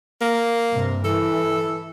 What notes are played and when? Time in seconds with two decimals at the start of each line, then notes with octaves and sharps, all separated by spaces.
0.22 A#3
0.71 G2 C3
1.05 E3 A4